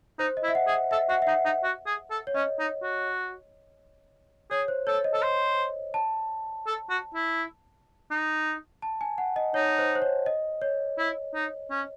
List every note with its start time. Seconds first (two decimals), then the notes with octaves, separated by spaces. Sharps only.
0.19 D#4 C5
0.37 D#5
0.43 E4
0.48 E5
0.55 F#5
0.67 G#4
0.91 A4 E5
1.09 F#4 F#5
1.22 E5
1.27 D#4 F#5
1.45 D#4
1.63 F#4
1.86 G#4
2.10 A4
2.27 C#5
2.34 C#4 D#5
2.59 D#4
2.83 F#4
4.51 G#4 C#5
4.68 C5
4.87 A4 C#5
5.04 D#5
5.13 A4
5.22 C5
5.94 A5
6.67 A4
6.90 F#4
7.14 E4
8.11 D#4
8.82 A5
9.01 G#5
9.18 F#5
9.36 D#5
9.54 D#4 C#5
9.78 C5
9.95 C5
10.02 C#5
10.26 D#5
10.62 C#5
10.98 E4
11.34 D#4
11.70 C#4